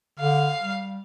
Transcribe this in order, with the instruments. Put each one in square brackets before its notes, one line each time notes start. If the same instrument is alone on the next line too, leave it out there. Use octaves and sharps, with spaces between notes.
[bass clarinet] D3 [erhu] F5
[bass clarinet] G3